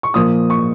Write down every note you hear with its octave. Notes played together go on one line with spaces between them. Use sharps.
C#6
A#2 F3 D#6
C#6